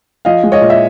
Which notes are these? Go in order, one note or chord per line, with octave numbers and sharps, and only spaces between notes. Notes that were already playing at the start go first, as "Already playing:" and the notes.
F3 D#5 F5
G#3
C#5 D#5
A#2
E5